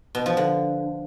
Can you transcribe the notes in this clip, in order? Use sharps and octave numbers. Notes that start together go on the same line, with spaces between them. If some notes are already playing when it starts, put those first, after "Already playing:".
B2
F3
D3